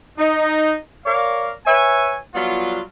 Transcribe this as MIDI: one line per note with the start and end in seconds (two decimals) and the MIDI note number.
0.18 0.75 63
1.05 1.51 70
1.05 1.51 73
1.05 1.51 74
1.05 1.51 77
1.66 2.16 71
1.66 2.16 73
1.66 2.16 76
1.66 2.16 80
2.35 2.79 54
2.35 2.79 55
2.35 2.79 59
2.35 2.79 65